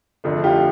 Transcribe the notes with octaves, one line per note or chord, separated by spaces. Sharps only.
F2 D3 F3 A3
F4 G4